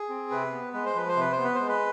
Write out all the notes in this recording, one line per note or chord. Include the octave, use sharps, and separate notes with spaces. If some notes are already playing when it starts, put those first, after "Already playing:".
Already playing: G#4
C4
C3 B4
B3
G#3 B4
C5
F3 B4
C5
C3 B4
C5
B3
B4
G#3 C5
B4